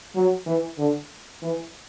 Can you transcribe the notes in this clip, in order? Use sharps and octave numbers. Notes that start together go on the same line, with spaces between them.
F#3
E3
D3
E3